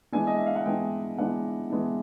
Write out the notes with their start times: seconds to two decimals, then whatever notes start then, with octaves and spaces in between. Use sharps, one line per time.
0.12 E3 G#3 B3 D4 G#5
0.27 D#5
0.36 E5
0.46 F5
0.56 F#5
0.65 E3 G#3 B3 D4 G5
1.18 E3 G#3 B3 D4 F#5
1.70 E3 G#3 B3 D4